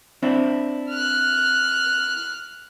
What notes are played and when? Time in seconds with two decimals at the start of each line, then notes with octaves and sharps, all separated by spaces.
0.23 C4 D4 E4
0.90 F6 F#6